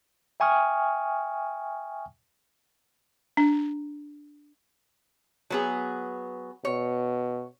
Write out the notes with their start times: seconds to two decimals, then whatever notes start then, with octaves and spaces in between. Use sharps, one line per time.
0.40 E5 G5 G#5 C#6 D#6 F6
3.37 D4
5.50 F#3 B3 G#4
6.65 B2 C#5